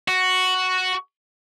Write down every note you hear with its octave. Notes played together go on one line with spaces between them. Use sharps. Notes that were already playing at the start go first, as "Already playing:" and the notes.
F#4